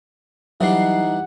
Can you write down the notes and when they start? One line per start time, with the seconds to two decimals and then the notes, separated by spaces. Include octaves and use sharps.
0.61 E3 F#3 G3 D4 D#4 F#5 C7